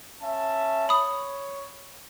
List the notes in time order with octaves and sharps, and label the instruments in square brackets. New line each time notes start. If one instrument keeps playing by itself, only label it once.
[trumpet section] C#4 E5 A5
[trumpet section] C#5 [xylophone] B5 D#6